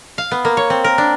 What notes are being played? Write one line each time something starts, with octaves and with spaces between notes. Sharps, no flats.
F5
B3
A#3
C#5
C4
A#4
D4